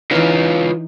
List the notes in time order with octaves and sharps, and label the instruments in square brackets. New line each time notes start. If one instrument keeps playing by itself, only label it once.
[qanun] E3 D#4 [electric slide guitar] F4 B4 C#5